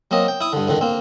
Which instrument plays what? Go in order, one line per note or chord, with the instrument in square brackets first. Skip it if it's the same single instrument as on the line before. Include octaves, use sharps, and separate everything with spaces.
[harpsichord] F#3 A#3 C4 D#5
G5
E4 D#6
G2 D3
F2 G#2 D3 D#3
A#3 C4